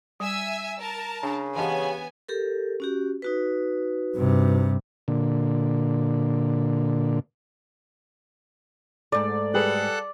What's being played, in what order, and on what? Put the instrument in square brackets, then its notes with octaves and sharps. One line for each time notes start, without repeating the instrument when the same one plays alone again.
[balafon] G3 [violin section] E5 G#5 E6
[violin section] A#4 A5
[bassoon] C#3 [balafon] D4 G#5
[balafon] E3 D#5 A5 [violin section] B3 G#5 [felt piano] G4 C#5 F5
[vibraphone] G4 A4 A#4
C#4 F#4 G4
D#4 F#4 B4
[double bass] G2 C3
[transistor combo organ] A#2 D3
[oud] G#2 A3 [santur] D5
[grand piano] G3 G#4 B4 [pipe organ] A4 F#5 F#6